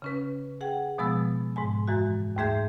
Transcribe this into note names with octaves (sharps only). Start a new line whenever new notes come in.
C#3 C#4 B4
G#4 F#5 G5
B2 F3 G#3 B3 E6 A6
G#2 G#3 G#5
F#2 E3 G#3 F#4
D#2 G#2 A3 G#4 E5 G6